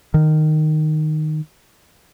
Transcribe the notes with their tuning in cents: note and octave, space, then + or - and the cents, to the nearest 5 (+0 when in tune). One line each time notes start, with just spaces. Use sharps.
D#3 -10